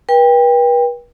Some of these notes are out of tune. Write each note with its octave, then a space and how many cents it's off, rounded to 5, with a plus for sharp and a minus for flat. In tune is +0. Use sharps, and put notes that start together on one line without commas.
B4 -40 G5 +25